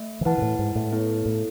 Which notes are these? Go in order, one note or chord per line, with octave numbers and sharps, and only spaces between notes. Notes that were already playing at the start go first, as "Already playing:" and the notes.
Already playing: A3 E5
D#3
E3 E4 B4 F#5 A5
B2
A2
G#2
A2
B3 E4 A4 C#5
A2